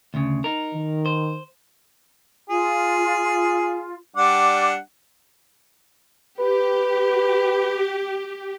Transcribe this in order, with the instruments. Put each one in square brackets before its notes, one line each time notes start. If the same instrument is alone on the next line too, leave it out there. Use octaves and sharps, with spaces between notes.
[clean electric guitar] D2 C#3
D#4 A#4
[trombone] D#3
[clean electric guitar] C5
[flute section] F4 [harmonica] G#4
[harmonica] G3 D4 F#5 [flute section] D6
[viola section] G4 [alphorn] B4